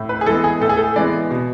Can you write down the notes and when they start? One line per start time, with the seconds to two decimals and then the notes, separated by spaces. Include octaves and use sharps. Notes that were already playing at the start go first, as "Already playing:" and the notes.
Already playing: A2
0.09 B4
0.21 G#4
0.26 E3 G#3 B3 A4
0.44 G#4
0.61 A2 A4
0.69 G#4
0.77 A4
0.96 E3 G#3 B3 D5
1.31 B2